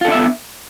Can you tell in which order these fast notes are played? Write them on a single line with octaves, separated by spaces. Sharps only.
F4 A4 D4 E5 B3